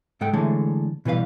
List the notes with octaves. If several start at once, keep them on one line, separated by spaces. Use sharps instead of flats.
G#2 G#3 A4 F#5 G5
D3 E3 G#3 A3 A4 C#5
B2 E3 G3 B4 F5